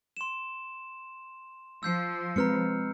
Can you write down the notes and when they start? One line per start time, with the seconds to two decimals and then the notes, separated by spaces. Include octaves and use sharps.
0.17 C6 E7
1.83 F3 E6 G6 C7
2.36 G#3 C4 B4 A#5 F6 C#7